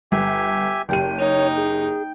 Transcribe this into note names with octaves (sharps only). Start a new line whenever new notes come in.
G1 G4 E5 G#5
F#1 G4 G5 D#7
D#4 C#5
G#4